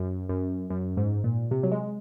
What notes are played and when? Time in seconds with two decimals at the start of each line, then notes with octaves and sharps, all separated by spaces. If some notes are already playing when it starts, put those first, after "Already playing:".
Already playing: F#2
0.29 F#2
0.70 F#2
0.97 G#2
1.24 A#2
1.51 C3
1.63 F#3
1.72 G#3